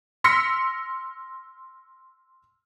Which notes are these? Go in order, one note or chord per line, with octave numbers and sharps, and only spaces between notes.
C6 E6 F6 A#6 B6 C#7